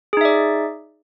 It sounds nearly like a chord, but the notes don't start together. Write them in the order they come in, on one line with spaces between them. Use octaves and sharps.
G#4 D#4 E5 D5